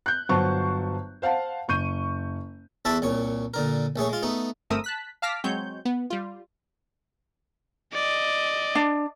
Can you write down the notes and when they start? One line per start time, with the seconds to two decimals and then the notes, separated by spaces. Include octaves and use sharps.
0.06 F#6 G6
0.29 G1 F#3 C5 A5 C#6
1.22 C5 F5 F#5 A5
1.68 F#1 C#6 G6 D#7
2.85 E2 E4 F#4 A4 A5 B5
3.02 C2 A#2 C#5
3.54 A#2 D3 A#4
3.96 A#1 A3 G#4 C#5
4.09 G#3 F4
4.23 A3 B3 D#4
4.70 G1 A3 C4 A#4 D#6 E6
4.84 A5 F#6 B6
5.22 F5 A5 D6 F6 A#6 B6
5.44 F#3 G#3 C4 C#5 G6
5.85 B3
6.10 G3 F4
7.94 D5 D#5
8.75 D4